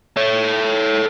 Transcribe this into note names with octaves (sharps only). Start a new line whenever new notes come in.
A4 C#5